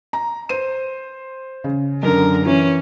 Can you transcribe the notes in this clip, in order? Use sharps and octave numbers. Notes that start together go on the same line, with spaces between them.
A#5
C5 D#7
C#3
F#2 D3 A#4
E3 C#4